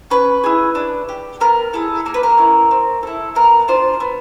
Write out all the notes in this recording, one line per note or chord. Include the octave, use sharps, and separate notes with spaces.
C#4 B4
E4 G#4
D4
G4
B3 A#4
E4 G#4 A4
A#3 A#4
B4
A#4
C#4 E4
C4
E4 A4
B3 A#4
D4 F4 C5
B3